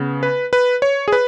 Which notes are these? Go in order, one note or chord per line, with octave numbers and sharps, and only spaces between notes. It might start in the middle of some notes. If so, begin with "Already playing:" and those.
Already playing: C#3 B3
B4
B4
C#5
G#4
B4